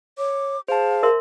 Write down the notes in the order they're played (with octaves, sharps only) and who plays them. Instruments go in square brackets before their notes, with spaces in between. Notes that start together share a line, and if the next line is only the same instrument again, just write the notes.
[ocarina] C#5 [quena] D6
[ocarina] G#4 [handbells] C5 A5 [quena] F5
[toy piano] A#4 E5 C6